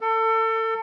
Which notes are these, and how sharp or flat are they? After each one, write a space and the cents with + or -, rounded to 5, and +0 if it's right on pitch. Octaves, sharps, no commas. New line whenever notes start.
A4 +30